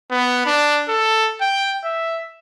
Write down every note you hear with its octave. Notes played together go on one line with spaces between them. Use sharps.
B3
D4
A4
G5
E5